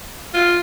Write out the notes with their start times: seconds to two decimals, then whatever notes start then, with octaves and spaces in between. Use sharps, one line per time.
0.34 F4